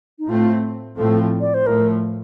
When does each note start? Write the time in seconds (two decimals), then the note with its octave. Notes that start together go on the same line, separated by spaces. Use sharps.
0.19 D#4
0.29 A2 A3 C4 F4
0.98 A2 F3 A3 C4 A4
1.41 D5
1.54 C5
1.67 A2 F3 A3 A#4